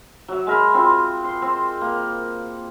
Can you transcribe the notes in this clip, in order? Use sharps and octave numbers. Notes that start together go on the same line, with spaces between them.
F#3 E5
G#3 A#4 B5
C4 F4
C6
C4
A#3